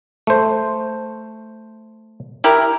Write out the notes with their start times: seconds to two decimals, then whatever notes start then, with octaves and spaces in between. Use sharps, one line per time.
0.27 A3 C5
2.44 E4 G4 A#4